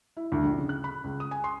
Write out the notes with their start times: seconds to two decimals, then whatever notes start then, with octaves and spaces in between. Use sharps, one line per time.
0.17 E4
0.32 D2
0.43 A#1
0.58 C#3
0.69 F#6
0.84 B5
1.04 C#2
1.20 D#6
1.31 G#5
1.44 C6